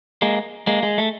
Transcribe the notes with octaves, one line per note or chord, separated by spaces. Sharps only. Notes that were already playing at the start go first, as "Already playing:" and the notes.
G#3 A#3
G#3 A#3
G#3
A3